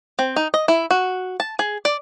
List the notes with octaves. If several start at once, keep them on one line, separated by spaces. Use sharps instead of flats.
C4
D#4
D#5
E4
F#4
A5
G#4
D5